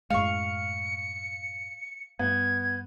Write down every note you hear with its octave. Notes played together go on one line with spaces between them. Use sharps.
F#2 A2 G#3 F5 C#6 C#7
G2 B3 G#6